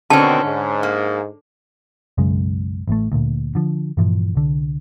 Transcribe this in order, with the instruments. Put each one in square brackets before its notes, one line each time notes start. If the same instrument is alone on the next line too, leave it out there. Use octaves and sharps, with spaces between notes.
[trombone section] B2 D#3 C4 [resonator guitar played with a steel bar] D3 C#4 [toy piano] A5
[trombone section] G#2
[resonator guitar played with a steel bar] A#3
[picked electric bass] B1 F#2 C#3 G#3
A1 A2 A3
D2 A#2
D3 F3
G2 A#2 E3 F3
C2 D3